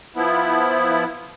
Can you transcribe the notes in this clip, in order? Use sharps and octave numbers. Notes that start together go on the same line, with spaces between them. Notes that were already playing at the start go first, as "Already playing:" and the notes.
F3 B3 E4